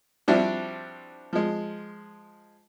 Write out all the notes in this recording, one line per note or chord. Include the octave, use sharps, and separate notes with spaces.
F3 G3 C4 D4 E4 F#4
F3 G#3